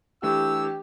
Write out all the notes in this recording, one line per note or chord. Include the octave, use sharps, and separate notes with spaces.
E3 A3 D4 G4 E6